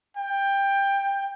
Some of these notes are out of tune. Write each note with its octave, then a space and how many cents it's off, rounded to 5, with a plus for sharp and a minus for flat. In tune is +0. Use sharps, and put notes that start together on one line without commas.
G5 +15